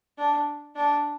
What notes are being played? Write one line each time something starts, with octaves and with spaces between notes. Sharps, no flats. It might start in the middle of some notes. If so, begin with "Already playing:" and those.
D4
D4